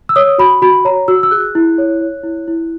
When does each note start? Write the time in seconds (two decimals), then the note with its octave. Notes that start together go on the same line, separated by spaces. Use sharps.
0.09 E6
0.16 C#5 D#6
0.38 F#4 B5
0.62 F#4 B5
0.85 C#5 A#5
1.08 F#4 E6
1.23 E6
1.31 G#4 F#6
1.55 E4
1.78 C#5
2.01 C#5
2.24 E4
2.48 E4